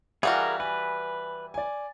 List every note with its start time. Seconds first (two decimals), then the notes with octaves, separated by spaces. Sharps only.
0.23 E3 G3 F#4 G#4 A#4 F5 F#5
0.60 B4 G#5
1.54 D5 G#5